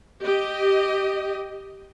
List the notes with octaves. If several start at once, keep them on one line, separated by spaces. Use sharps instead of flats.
G4 D#5